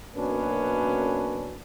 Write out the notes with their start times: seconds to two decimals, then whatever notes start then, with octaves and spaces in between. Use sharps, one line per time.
0.16 F#2 B2 A#3 C#4 D4 B4